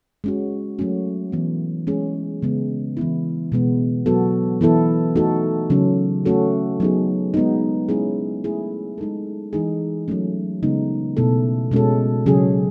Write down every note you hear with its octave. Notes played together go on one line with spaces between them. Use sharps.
G#3 C#4 F#4
F#3 A3 C#4 F#4
E3 B3 E4
G#3 C#4 G#4
C#3 G#3 B3
E3 B3 E4
B2 G#3 B3
F#3 B3 F#4 A4
E3 B3 E4 A4
A3 D#4 F#4 A4
C#3 F#3 C#4
A3 C#4 F#4 A4
F#3 B3 D#4 G#4
G#3 B3 D#4
G#3 C#4 E4 G#4
A3 E4 G#4
G#3 D#4 A4
E3 G#3 D#4 G#4
F#3 A3 C#4
C#3 G#3 B3 D#4
B2 A3 E4 A4
B2 G#3 C#4 F#4 A4
C#3 F#3 C#4 G#4